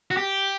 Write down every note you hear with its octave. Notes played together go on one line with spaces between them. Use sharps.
F#4
G4